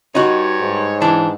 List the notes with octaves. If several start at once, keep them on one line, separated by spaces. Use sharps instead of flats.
G2 D#4 F#4 C#5
G#2
E3 D4